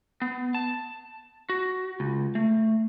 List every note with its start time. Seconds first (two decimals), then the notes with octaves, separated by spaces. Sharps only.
0.22 B3
0.54 A5
1.49 F#4
2.00 C#2
2.35 A3